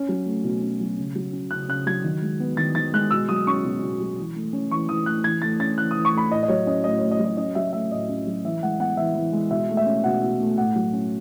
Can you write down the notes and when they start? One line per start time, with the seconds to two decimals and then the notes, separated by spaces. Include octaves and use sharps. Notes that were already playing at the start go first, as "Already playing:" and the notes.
Already playing: C#4
0.09 F#3
0.26 A3
0.44 B2
0.62 C#4
0.81 F#3
0.98 C#3
1.15 F#3
1.33 C#4
1.51 C#3 F#6
1.68 C#3 F#6
1.86 F#3 G#6
2.04 D#3
2.22 G#3
2.40 B3
2.57 D#3 A6
2.75 D#3 A6
2.94 G#3 F#6
3.11 B2 E6
3.29 F#3 D#6
3.47 C#4 C#6
3.64 B2
3.82 B2
4.00 F#3
4.18 E3
4.36 A3
4.53 C#4
4.71 E3 C#6
4.89 E3 D#6
5.06 A3 F#6
5.24 E3 G#6
5.42 A3 A6
5.60 C#4 A6
5.78 E3 F#6
5.91 E3 D#6
6.05 C#6
6.14 A3 B5
6.31 A2 D#5
6.43 D#5
6.48 F#3 C#5
6.67 C#4 D#5
6.84 A2 D#5
6.98 A2 C#5
7.11 D#5
7.19 F#3
7.25 D#5
7.37 C#4 D#5
7.55 F#3 E5
7.73 A3 E5
7.91 A2 D#5
8.09 C#4
8.27 F#3
8.45 E3 E5
8.63 G#3 F#5
8.80 B3 F#5
8.97 E3 E5
9.15 E3
9.33 G#3
9.51 B2 E5
9.69 A3
9.77 E5
9.86 C#4
10.04 B2 F#5
10.23 B2
10.40 A3
10.58 A2 F#5
10.76 F#3
10.93 C#4